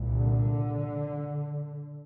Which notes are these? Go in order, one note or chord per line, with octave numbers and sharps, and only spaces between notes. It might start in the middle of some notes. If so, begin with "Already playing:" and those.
Already playing: C2 A#2
D3